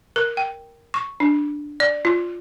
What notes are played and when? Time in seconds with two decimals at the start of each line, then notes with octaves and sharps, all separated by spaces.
0.16 A#4
0.37 G5
0.94 C#6
1.20 D4
1.80 D5
2.05 F4